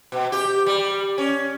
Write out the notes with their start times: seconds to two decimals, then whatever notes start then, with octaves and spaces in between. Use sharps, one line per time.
0.12 B2
0.32 G4
0.66 G3
1.18 C#4